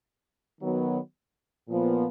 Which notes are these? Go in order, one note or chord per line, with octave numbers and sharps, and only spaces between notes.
D#3 F#3 B3
A#2 F3 B3